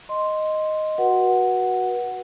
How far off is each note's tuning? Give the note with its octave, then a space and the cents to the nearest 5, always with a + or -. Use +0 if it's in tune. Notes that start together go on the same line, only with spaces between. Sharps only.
D#5 +0 C6 +0
F#4 +0 B4 -35 F#5 +0